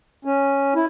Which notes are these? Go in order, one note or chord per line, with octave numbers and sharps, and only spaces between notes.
C#4
E4